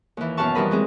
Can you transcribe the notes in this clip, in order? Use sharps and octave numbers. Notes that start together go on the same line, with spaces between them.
D#2 E3
F#2 B2 F5 F#5 A5 C#6
F2 E3 G3 A#4 D#5 B5
F#3 G#3 C4 G#4